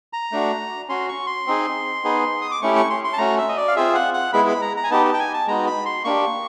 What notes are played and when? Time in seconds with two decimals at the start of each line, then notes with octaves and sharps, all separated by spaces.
0.13 A#5
0.32 A3 D4 F#4
0.89 C#4 F#4 C6
1.09 C#6
1.27 C6
1.47 C4 D#4 G#4
2.04 B3 D#4 G#4
2.42 D#6
2.52 D6
2.62 A3 C#4 E4 G4 C#6
2.76 C#6
2.90 C6
3.04 C6
3.13 A5
3.18 A3 C#4 F#4 A#5
3.38 E5
3.49 D#5
3.57 D5
3.68 F5
3.76 C4 F4 G#4 E5
3.95 F#5
4.14 F#5
4.33 G#3 B3 E4 G#4 B5
4.48 B5
4.62 A#5
4.77 A#5
4.84 G#5
4.91 B3 D#4 G4 A5
5.05 A5
5.14 G5
5.19 G#5
5.34 A5
5.47 G#3 B3 D#4 F#4 A#5
5.67 B5
5.86 C6
6.05 A#3 D4 G4 C#6